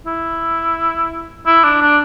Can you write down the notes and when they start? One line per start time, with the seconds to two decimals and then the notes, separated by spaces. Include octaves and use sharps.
0.07 E4
1.46 E4
1.64 D4
1.82 D4